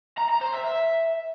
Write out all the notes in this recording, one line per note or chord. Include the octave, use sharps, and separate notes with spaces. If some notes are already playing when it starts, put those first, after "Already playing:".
A#5
A#5
C5
E5
E5